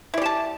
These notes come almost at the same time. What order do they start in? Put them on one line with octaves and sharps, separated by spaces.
E4 D5 G4 A5